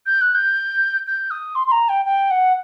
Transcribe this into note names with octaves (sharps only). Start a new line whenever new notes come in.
G6
F#6
G6
G6
D#6
C6
C6
A#5
G5
G5
F#5